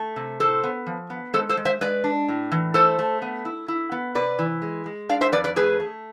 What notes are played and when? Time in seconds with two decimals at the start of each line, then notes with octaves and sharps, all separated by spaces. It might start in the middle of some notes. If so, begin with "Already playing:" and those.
Already playing: A3
0.16 C3
0.40 A2 A4 C5
0.63 B3
0.87 F3
1.10 B3
1.34 G#3 A4 C5
1.49 A4 C5
1.57 G#3
1.65 C5 E5
1.81 G#3 B4 D5
2.04 D4
2.28 A2
2.52 E3
2.74 A3 A4 C5
2.99 A3
3.22 B3
3.45 E4
3.68 E4
3.92 B3
4.15 C3 B4 D5
4.39 E3
4.62 G#3
4.86 G#3
5.09 D4 D5 F5
5.21 C5 E5
5.32 F2 B4 D5
5.44 B4 D5
5.56 A3 G#4 B4
5.80 A3